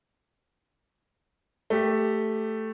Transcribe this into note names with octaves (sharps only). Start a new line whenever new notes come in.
A3 G4